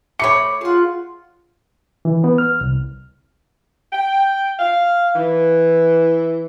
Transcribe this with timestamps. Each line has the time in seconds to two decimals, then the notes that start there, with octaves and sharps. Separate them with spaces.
0.19 A3 C#5 B5 D6 C#7
0.61 F4 G#4 F#5
2.05 E3
2.24 B3
2.38 F6
2.61 C2
3.93 G5
4.60 F5
5.16 E3